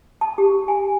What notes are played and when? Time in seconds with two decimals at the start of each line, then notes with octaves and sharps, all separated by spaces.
0.21 A5
0.38 G4
0.68 G#5